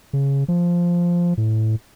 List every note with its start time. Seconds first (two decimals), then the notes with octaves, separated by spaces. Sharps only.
0.13 C#3
0.48 F3
1.37 A2